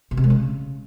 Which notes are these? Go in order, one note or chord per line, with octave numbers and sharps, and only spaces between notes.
A#2
C3
G#3
C#3